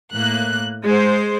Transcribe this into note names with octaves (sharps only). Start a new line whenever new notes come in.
A2 A#3 F#6
G#3 C5